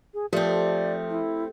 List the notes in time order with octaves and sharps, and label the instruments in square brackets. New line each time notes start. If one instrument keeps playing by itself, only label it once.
[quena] G#4
[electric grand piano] F3 [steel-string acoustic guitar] A3 C4 [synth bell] G4 [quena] D5
[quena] E4